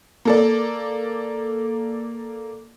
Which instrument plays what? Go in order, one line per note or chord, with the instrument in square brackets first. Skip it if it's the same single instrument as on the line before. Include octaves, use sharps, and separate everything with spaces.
[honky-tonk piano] A#3 A4 D5